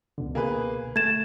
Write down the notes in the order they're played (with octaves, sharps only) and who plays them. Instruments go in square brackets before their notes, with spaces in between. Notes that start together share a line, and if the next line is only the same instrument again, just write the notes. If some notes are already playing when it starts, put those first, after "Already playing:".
[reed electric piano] C#2 B2 D3
[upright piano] A#3 G#4 B4
[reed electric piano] A3 [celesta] G#6 E7 [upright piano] A6